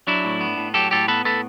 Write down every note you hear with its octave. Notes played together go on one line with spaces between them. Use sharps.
F#3 D4 E4
A2
B3
A2
F#3 G4 A4
A2 G4 A4
B3 A4 B4
A2 A4 B4